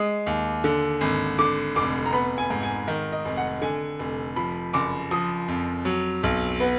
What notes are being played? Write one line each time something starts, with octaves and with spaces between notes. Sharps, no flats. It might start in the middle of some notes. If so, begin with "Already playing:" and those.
Already playing: G#3 D#6
D#2
D3
G#1
D3 D6
F1 D6
A#5
B3 B5
G#5
G#2
G#5
D#3
D#5
F1
F#5
D3 G#5
F1
F3 B5
F#1 D6
F3 D#6
F2
F#3
B1
B3